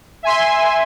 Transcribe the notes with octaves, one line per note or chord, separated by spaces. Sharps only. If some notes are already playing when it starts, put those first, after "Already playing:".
E5 G#5 C6